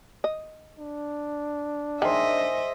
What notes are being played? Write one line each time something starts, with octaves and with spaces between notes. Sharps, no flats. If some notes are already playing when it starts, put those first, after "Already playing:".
D#5
D4
D#3 G#4 C5 D#5 E5